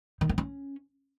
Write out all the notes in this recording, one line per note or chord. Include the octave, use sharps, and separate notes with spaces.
D#3
A#3
C#4